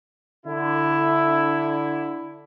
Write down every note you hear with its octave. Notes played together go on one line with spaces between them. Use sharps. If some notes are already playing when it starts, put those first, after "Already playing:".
D3 E4